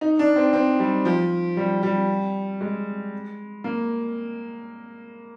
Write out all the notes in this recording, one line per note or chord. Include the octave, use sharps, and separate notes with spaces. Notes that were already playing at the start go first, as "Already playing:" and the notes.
D#4
D4
C4
C4
G3
F3
G3
G3
G#3
A#3